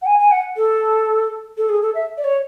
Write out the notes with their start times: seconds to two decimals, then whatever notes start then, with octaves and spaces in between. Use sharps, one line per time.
0.02 F#5
0.06 G#5
0.19 G#5
0.31 F#5
0.57 A4
1.57 A4
1.69 G#4
1.82 A4
1.95 E5
2.17 D5
2.24 C#5